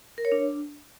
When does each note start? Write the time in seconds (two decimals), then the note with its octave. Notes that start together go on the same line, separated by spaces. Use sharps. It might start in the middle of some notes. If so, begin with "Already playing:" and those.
0.18 A#4
0.25 C#5
0.32 D4